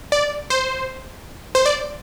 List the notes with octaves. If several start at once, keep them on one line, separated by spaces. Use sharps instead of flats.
D5
C5
C5
D5